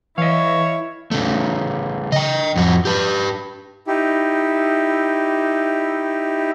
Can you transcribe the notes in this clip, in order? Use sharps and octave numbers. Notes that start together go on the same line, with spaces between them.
E3 E4 C#5 D#5 F5
C#3 A3
D#5 G5
F2 F#4
G4 B4
D#4 E4 G4